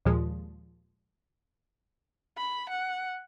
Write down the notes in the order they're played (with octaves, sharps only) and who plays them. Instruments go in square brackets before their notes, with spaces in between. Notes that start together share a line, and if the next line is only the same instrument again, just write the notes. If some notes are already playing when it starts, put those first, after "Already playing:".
[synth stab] D#2 A#2 F3 G#3
[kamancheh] B5
F#5